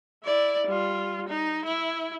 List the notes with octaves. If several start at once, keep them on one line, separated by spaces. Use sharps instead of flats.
E4 D5
G3 F4
D#4
E4